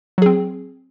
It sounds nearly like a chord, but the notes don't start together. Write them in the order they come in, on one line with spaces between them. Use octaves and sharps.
F#3 G#4 C4